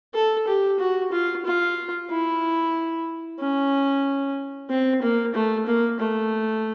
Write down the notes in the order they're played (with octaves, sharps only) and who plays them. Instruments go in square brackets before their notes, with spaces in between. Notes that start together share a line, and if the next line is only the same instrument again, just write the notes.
[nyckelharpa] A4
G4
F#4
F4
F4
E4
C#4
C4
A#3
A3
A#3
A3